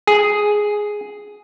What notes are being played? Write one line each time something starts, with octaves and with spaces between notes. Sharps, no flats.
G#4